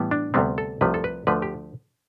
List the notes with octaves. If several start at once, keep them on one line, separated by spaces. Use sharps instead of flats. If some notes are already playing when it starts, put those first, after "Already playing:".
Already playing: A2 E3 G3 B3
D4
D2 C3 G3 B3 C4
A4
C2 C3 F3 A3 B4
A4
B4
D2 D3 F3 A3 B4
G4